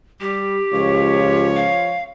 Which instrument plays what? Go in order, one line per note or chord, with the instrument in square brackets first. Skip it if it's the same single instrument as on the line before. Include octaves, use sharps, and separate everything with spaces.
[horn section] G3 [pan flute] G4
[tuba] C#2 [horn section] F3 F4 C#5
[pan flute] F5